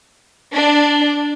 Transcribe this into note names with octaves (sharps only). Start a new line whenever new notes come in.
D4